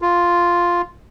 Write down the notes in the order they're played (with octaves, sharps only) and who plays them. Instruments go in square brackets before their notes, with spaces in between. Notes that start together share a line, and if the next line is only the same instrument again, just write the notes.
[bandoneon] F4